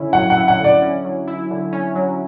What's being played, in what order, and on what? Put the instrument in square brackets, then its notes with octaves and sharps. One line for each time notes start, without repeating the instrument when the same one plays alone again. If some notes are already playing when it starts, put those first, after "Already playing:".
Already playing: [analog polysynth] D3 C#4 E4
[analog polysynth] F#3 [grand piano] F#5
[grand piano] F#5
[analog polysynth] E4
[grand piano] F#5
[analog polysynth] D3 [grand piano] D5
[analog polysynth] C#4
F#3
E4
D3
C#4
F#3